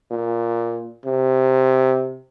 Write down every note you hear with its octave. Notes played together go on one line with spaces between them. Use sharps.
A#2
C3